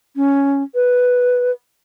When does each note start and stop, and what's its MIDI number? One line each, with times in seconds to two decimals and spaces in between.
0.16 0.63 61
0.75 1.51 71